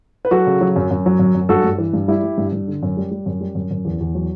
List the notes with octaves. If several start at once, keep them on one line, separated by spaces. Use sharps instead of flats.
B4
F#3 F#4 A4
C#3
F#3
F#2
F#2
F#3
F#2
F#2
G2 F#4 A4
G2
E3
G2
G3 E4 G4
G3
G2
G2
D3
F#2
G3
G3
F#2
G3
F#2
F#2
E2
E2
F#3